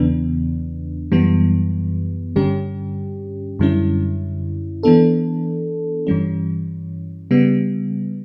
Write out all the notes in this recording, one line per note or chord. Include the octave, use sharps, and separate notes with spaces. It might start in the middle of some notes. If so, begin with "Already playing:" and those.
Already playing: E2 C#3 E3 B3 D4
F#2 E3 G3 B3
G2 D3 G3 C#4 G4
F#2 D3 G3 C#4 E4
E3 B3 D4 A4
G2 E3 G3 C#4
C#3 G3 B3